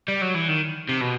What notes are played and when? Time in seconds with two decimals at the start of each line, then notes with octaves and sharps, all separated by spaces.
0.08 G3
0.22 F#3
0.35 E3
0.49 D#3
0.89 C3
1.01 B2